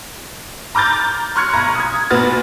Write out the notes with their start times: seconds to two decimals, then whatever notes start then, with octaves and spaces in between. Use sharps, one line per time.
0.75 A#5 D6 F6 G6 A6
1.36 C6 C#6 F6 F#6 G#6 C#7
1.53 B1 A#5
1.75 D#6 G#6
2.10 A#2 B3 F#4 B4 F6 A6